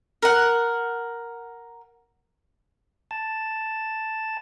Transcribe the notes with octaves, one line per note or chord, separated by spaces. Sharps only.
A#4 F#5
A5